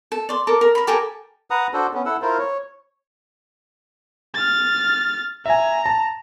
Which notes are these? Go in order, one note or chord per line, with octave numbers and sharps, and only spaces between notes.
A4
D5 C6
A4 A#4 D6
A#4
A#4 B5
G4 A4 A#4 G#5
B4 F#5 A#5 D#6
D4 F#4 A4 C5
B3 C#4
E4 A4 F#5 E6
E4 F4 A#4 C5
C#5
F6 A6
E5 G#5 A#5
A5